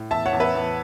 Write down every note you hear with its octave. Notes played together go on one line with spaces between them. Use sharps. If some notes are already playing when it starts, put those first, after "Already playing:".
Already playing: A2
E2 E5 A5
C#5 F#5
E2
B4 E5
E2